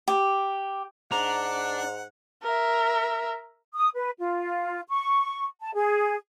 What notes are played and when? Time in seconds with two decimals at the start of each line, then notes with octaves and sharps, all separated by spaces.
0.08 G4
1.12 G#2 D4 F#5 A#5
2.42 A#4 E5
3.74 D#6
3.95 B4
4.18 F4
4.89 C#6
5.60 A5
5.73 G#4